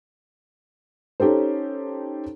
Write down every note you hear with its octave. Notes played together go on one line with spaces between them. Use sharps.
C#4 D#4 G4 A4 C5